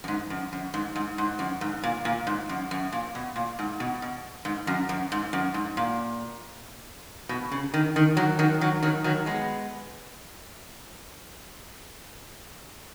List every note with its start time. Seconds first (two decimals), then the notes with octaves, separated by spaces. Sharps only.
0.04 F#2
0.08 G#2
0.30 F#2
0.53 F#2
0.74 G#2
0.96 G#2
1.18 G#2
1.39 F#2
1.61 G#2
1.83 A#2
2.05 A#2
2.27 G#2
2.49 F#2
2.71 F#2
2.92 A#2
3.15 B2
3.36 A#2
3.59 G#2
3.80 B2
4.02 B2
4.45 G#2
4.67 F#2
4.89 F#2
5.12 G#2
5.33 F#2
5.54 G#2
5.77 A#2
7.29 B2
7.52 C#3
7.74 D#3
7.96 D#3
8.17 D#3 F#3
8.39 D#3 F#3
8.61 D#3 F#3
8.82 D#3 F#3
9.04 D#3 F#3
9.26 G#3 B3